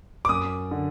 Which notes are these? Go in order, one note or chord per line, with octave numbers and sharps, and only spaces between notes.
D6
F#2 D#6
D3